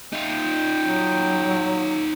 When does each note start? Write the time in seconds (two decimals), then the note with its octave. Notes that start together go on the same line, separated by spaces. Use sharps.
0.13 D#4 F4 G5
0.84 F#3